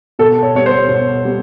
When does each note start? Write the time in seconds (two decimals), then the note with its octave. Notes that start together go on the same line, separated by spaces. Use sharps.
0.19 B2 A4
0.43 C#5
0.54 G3 B3 C#5
0.66 C5
0.89 B2
1.24 G3 B3